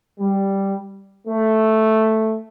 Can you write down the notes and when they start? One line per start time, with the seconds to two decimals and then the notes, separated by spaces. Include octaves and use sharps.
0.20 G3
1.28 A3